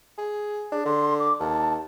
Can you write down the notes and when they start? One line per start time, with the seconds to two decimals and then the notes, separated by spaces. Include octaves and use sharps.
0.18 G#4
0.72 D4 G#4
0.86 D3 C6
1.20 D6
1.40 D#2 A5